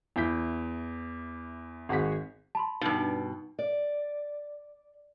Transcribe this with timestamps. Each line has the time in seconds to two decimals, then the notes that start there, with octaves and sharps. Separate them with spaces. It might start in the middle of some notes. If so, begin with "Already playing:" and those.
0.16 E2 E4 G6 B6
1.89 G#1 F#4 G#4 F#5 B6
2.55 A5 B5 C6
2.81 G2 B2 D#4
3.59 D5